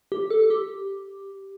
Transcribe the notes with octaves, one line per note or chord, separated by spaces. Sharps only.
G4
A4
A4
G4